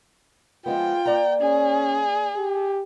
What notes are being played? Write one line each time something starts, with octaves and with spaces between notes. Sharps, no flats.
F3 G#3 B3 F4 G5
A#3 D5 A#5
C#4 G#4
G4